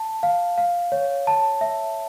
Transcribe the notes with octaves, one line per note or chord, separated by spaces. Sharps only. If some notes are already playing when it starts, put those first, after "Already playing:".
Already playing: A5
F5
F5
C#5
A5
E5